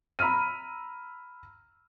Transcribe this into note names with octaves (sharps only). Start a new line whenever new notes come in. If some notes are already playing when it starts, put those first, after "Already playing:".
A#5 B5 E6 F6 D#7